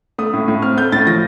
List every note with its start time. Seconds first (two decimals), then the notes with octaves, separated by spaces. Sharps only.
0.18 A3 D#6
0.33 A2
0.48 A2
0.62 C4 F6
0.77 A3 G6
0.92 A2 A6
1.07 F3 A#6